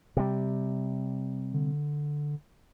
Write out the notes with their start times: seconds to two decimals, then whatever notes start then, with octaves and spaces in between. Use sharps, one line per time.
0.17 C3 G3
1.53 D3